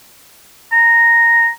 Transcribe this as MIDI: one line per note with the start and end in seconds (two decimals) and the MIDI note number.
0.72 1.48 82